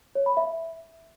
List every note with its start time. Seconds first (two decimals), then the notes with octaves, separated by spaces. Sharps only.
0.15 C#5
0.26 B5
0.37 E5